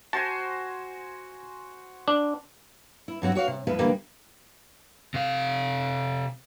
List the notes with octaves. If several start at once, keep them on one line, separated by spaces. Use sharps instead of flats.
F#4 C5 G#5 A5
D4
E4
G2 F#3 C4 F#4
F#4 C#5 D5 F5
C3
E2 F3 G#3 E4 B4
D2 D3 E3 G3 G#3 A#3
C3 F5